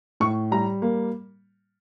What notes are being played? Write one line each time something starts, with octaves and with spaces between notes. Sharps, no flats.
A2 C#6
G3 A#5
A#3